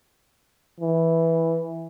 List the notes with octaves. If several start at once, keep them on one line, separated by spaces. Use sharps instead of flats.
E3